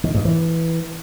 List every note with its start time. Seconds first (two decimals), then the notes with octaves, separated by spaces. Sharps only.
0.04 D#3
0.15 G2
0.25 E3